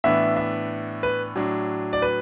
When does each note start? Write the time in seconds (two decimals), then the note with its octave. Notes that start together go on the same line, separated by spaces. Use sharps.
0.04 A2 E3 B3 D4 E5
0.36 E5
1.03 B4
1.35 A2 F#3 D4
1.93 D5
2.02 B4